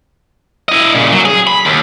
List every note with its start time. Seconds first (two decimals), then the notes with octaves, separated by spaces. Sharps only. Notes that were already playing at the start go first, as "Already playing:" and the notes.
0.69 E4 D#5
0.95 A#2 C#3
1.12 F#3
1.25 G#4
1.47 B5
1.65 D#2